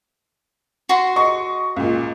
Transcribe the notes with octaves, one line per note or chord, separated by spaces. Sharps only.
F#4 C6
D#5 C#6
C#2 A#2